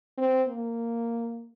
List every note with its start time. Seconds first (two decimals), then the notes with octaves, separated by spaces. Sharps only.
0.18 C4
0.49 A#3